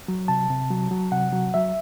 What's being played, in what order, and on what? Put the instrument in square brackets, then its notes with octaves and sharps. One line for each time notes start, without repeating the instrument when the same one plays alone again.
[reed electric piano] F#3
C3 A5
C3
F#3
F#3
C3 F#5
F#3
F#3 E5